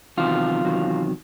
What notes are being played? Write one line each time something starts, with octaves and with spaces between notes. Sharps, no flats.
E2 C3 D#3 F#3 F4
E2 C3 D#3 F#3